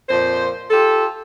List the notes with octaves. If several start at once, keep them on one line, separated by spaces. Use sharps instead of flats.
F2 A#2 C5
F4 G4 A4